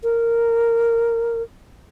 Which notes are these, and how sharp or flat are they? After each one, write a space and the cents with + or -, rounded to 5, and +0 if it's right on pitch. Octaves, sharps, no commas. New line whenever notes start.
A#4 -10